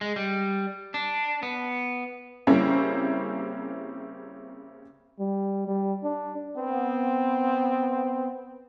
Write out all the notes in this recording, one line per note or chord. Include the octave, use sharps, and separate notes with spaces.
G#3
G3
D4
B3
C#3 G3 A#3 C4 C#4 E4
G3
G3
D4
B3 C4